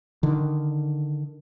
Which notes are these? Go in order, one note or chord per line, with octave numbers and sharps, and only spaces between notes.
D3 D#3